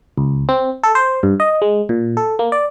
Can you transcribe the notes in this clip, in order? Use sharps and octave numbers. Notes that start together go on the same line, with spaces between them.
C#2
C4
A4
C5
G2
D#5
G#3
A#2
A4
A#3
D5